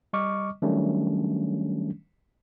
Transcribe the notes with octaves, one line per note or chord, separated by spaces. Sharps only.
G3 D#5 C#6 D6 F6
D#3 F#3 G3 A3 C#4 D4